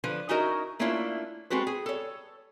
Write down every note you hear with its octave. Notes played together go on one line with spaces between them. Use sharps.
D3 F3 B4
C#4 D#4 E4 F#4 A#4 D#5
A3 A#3 C#4 D4 E4 F4
G#3 C4 F#4 A4 B4
G#4
A4 C#5